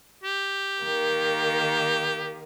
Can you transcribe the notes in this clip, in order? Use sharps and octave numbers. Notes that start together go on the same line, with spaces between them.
G4
D#3 A#3